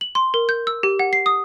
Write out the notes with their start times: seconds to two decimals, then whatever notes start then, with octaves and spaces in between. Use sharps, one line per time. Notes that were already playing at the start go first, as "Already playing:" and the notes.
0.01 F#7
0.15 C6
0.34 A#4
0.49 G6
0.67 E6
0.83 G4
0.99 F#5
1.13 C7
1.26 D#6